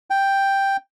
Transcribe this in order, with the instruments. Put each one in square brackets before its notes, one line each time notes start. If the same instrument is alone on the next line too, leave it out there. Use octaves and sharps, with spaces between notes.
[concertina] G5